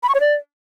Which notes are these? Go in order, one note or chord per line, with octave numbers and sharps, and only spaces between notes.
B5
C#6
C#5
D5